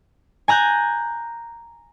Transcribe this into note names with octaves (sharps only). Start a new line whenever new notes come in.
G#5 A#5 F#6 G6